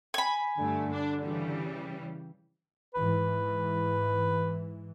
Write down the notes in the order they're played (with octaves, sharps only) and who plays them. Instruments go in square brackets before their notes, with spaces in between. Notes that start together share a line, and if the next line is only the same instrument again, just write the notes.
[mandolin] G#5 B5
[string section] G2 A3 [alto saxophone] D3
[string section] D4
C#3 E3 G3
[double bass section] G#2 E3 [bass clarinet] B4